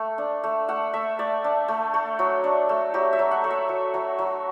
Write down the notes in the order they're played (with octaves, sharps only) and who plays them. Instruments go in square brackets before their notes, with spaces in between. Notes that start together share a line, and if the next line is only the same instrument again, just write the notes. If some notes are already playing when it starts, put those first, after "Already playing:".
Already playing: [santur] A3
D4
A3
A3 F#5
A3 E5
A3 D5
D4
A3
A3
F#3
D4
A3
F#3 G4
E5
F#3
F#5
A3
E5
F#3
F#3
F#3